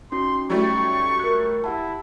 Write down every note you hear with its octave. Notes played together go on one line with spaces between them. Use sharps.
C#4 D#4 F#4 C6
F#3 G3 A3 C#6
A#4 F#6
E4 G4 F#5 A5